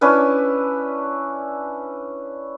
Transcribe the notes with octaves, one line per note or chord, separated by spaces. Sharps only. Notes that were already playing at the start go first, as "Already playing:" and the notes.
C#4 D4 E4 B4